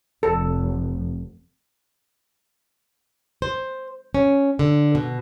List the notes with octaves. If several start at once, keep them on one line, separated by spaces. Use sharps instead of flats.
F1 A4
C5
C#4
D3
B2